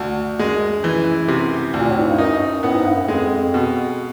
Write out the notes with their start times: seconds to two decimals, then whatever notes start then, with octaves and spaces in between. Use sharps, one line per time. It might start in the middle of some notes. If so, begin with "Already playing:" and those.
Already playing: D2
0.39 F#2 G#3
0.84 E3
1.28 C3
1.74 D2 A#2
1.89 A2
1.99 G#2
2.08 G2
2.18 F#2 D#4
2.63 A2 B3
2.76 G#2
2.86 G2
2.97 F#2
3.08 F2 G#3
3.54 B2